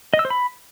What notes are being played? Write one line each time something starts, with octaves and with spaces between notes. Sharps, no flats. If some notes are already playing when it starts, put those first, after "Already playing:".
D#5
E6
C5
B5